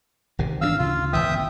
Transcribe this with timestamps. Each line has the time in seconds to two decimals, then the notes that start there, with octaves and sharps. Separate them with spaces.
0.39 G#1 C3 D#3
0.61 E3 B3 D4 F5 E6
0.79 D2 C#3 F4
1.13 G1 C2 E3 E5 G5 D#6